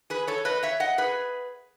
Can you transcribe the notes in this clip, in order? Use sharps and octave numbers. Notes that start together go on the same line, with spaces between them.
G#4 B4
A4 C#5
B4 D#5
C#5 E5
D#5 F#5
G#4 B4